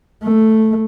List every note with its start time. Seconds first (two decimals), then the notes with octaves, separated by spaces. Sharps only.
0.23 A3